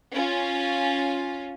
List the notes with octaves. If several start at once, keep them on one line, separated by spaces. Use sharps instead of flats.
C#4 F4